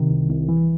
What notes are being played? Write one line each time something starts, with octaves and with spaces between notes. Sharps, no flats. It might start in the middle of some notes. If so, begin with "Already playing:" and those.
Already playing: C3 D#3
C2
C2
E3